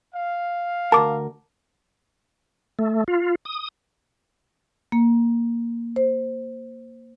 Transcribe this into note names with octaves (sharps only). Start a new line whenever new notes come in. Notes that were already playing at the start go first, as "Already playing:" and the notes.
F5
D2 A#4 A5 D6
A3
F4
D#6
A#3
C5